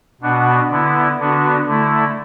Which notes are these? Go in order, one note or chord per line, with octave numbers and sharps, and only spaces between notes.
B2 B3 D4 F#4
D3 B3 E4
D3 B3 D4 F#4
D3 A3 E4